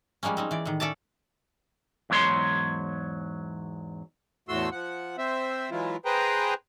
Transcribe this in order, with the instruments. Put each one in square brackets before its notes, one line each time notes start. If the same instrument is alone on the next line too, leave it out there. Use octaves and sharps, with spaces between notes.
[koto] F3 G3 G#3 A#3 C#4
C4 C#4 D#4
E3 D5
A2 D#3
C#4 A4 D5 E5 A5
[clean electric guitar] E2 G#2 F#3 C#5 C6
[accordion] E2 A2 A3 F#4 C6 E6
F3 F#5
C4 C5 E5
E3 F#3 G#3 E4 F4
G#4 B4 C5 G5 A#5